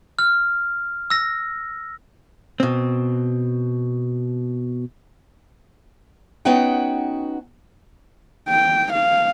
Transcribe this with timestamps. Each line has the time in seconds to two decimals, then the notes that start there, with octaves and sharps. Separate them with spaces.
0.19 F6
1.10 E6 A#6
2.60 B2 C4
6.45 B3 C#4 D#4 F#4 F#5 G5
8.49 G5
8.93 F5